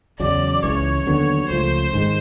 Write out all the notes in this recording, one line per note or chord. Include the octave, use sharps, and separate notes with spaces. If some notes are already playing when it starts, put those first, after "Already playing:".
E2 C#3 F#3 D5
C#2 C#3 E3 C#5
D#2 D3 F#3 B3
C#2 C#3 F3 A3 C5
G#2 D#3 G#3